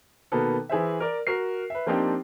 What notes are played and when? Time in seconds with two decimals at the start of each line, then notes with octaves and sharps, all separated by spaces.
0.32 B2 D#3 A#3 B3 A4
0.69 E3 G#4 C5 E5
1.00 A#4 D5
1.27 F#4 A#4 C7
1.70 B4 E5
1.86 F3 A#3 C4 D4 D#4 G4